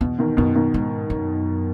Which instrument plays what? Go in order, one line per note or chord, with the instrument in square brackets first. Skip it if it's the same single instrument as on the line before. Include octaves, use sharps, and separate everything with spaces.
[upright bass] E2 [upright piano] B2
[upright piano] B2 D#3
[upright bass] F#2 [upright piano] B2 D#3
[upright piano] B2 D#3
[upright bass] G#2
F#2